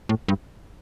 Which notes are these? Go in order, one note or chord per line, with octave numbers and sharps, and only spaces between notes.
A2
G2